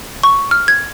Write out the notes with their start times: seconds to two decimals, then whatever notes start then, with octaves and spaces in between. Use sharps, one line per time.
0.23 C#6
0.51 F6
0.68 G#6